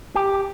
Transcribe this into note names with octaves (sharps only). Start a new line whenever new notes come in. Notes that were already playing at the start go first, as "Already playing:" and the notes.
G4